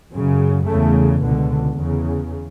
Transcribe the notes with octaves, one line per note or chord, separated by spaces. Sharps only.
F#2 C#3
E2 C#3 A3
C#2 B2 D3
E2 C#3